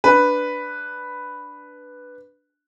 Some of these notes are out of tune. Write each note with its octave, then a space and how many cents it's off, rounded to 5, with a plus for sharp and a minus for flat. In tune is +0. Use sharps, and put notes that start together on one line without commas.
D4 +0 B4 +0